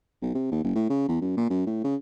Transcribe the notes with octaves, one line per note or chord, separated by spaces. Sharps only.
B1
C3
D#2
F#1
A2
C#3
E2
F#2
A#2
F#2
A2
C#3